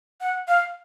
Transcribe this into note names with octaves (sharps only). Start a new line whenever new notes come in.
F#5
F5